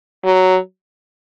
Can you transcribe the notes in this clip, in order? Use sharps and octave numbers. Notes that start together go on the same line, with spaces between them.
F#3